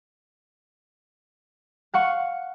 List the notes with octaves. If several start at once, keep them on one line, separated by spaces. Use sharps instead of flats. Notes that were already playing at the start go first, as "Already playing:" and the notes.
F5 F#5 C#6